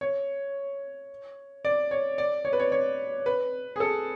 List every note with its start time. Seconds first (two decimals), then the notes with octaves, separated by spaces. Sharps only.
0.01 C#5
1.65 D5
1.91 C#5
2.18 D5
2.45 C#5
2.53 B4
2.59 C#5
2.72 C#5
3.26 B4
3.76 G#4
3.80 A4